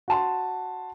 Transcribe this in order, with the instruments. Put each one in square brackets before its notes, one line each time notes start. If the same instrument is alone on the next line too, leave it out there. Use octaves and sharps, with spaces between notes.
[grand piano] F#4 A5 C6